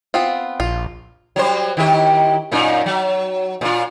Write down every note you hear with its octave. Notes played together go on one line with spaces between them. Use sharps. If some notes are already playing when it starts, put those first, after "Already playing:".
B3 C4 F4
A#1 F4
F#3 G3 C5
D#3 E4 G4
F#2 A#2 D#4
F#3
A#2 F4